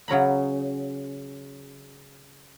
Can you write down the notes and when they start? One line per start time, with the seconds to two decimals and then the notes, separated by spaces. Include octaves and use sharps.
0.08 C#3 F#3 A#5 B5